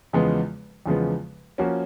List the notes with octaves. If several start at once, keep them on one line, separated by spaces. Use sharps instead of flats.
E2 C#3 F3 G#3 B3
E2 C#3 F3 G#3 B3
F3 A#3 C#4 F#4